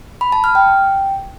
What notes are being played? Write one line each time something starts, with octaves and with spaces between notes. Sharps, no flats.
B5
A5
F6
G5